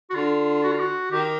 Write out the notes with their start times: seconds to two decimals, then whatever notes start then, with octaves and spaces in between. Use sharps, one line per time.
0.10 F#4
0.15 D3 F4
0.64 F#4
0.73 F4
0.80 F#4
1.12 D#3 G4